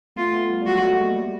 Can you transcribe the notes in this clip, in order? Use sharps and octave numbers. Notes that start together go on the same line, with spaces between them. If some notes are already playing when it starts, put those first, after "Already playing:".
A3 B3 F4
A3 B3
G3
G3
F#3 G#3 F#4
G3 A3
A3
G#3 A#3
G3